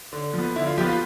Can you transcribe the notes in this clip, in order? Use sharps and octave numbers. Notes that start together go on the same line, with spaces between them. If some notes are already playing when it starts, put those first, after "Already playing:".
D3
F3
B3
D3 E4
F4
F3 B3 G4
F4